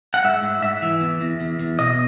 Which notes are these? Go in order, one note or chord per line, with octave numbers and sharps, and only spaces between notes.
F#5
G#2 E5
G#2
G#2 E5
E3
E2
E2
E2
E2
B2 D#5